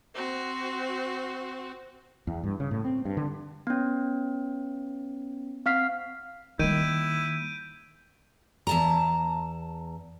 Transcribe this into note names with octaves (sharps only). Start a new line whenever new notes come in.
C4 F#4
E2
G2
C#3
A2
C4
G2
D3
B3 C#4
C4 F5 F6 B6 C7
D#3 G3 A#3 E4 G6 D7 D#7
E2 A5 A#5